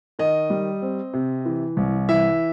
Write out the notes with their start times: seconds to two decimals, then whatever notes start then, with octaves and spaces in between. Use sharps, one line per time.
0.19 D#3 D#5
0.50 G3
0.82 C4
1.14 C3
1.45 E3
1.77 C2
2.09 E3 E5